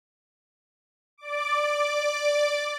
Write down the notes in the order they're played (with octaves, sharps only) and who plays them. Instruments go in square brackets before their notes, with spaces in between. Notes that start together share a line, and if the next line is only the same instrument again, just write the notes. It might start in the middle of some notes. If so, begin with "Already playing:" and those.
[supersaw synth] D5 D6